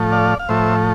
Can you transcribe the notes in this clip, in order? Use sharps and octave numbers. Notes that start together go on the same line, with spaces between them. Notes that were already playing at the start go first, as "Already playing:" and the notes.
Already playing: A2 F3 A3
D5 F5
F5
A2 F3 A3 C5 E5